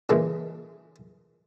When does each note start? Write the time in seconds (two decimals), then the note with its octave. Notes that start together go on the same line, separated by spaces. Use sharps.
0.09 A#2 C#3 E3 G#3